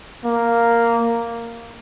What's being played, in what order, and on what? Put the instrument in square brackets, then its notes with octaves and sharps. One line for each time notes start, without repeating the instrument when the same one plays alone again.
[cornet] A#3